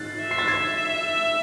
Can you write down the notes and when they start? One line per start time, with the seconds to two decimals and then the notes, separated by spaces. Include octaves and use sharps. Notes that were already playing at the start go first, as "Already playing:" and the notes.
Already playing: F#6 A6 C7
0.22 E5
0.31 C7
0.38 A6
0.48 G#6 C7